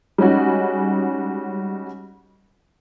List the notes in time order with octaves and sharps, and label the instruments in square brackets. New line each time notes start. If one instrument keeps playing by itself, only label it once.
[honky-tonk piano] G3 G#3 C#4 D#4 F#4